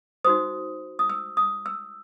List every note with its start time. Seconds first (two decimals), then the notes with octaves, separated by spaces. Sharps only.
0.25 D#4 F#4 C5 D#6
0.99 D#6
1.09 E6
1.37 D#6
1.66 E6